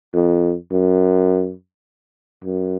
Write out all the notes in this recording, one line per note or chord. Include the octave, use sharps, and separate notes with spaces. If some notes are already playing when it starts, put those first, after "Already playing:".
F2
F#2
F#2